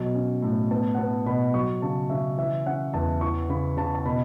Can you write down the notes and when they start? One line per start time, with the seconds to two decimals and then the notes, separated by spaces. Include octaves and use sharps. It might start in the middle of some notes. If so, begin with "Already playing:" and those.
Already playing: B2 F#3
0.15 C#4
0.42 A2
0.71 B3 A5
0.95 F#5
0.99 B3 A5
1.26 B2 B5
1.54 F#3 C#6
1.82 C#3 A5
2.10 C#3 E5
2.38 E3 E5
2.66 C#4 F#5
2.94 E2 A5
3.21 E3 C#6
3.49 C#3 B5
3.77 C#3 A5
3.95 A5
4.05 B2 B5